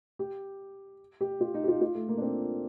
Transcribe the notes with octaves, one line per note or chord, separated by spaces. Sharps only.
G4
G4
F4
D#4
G4
F4
F4
A3
A#3
D4
C4